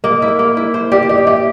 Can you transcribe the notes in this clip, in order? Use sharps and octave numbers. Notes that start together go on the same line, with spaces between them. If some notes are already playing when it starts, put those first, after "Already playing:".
A#3 D#5
E4
A#3
E4
C5
G4 D5
G4 D#5
G4 E5